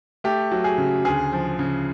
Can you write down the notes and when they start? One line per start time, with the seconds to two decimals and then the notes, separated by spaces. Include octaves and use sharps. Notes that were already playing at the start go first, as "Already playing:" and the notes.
0.24 A3 G4
0.52 F#3
0.64 G#4
0.78 C#3
1.05 D2 G#4
1.32 F3
1.59 C#3